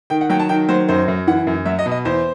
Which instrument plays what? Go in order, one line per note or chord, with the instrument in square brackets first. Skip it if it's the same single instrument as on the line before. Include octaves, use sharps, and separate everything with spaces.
[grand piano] D#3 G5
F#5
F#3 G5
A5
D#3 G5
F#3 C5
F#2 C5
F#2
E3 F#5
F#2
F#3 E5
D#5
B2
D#5
E2 C5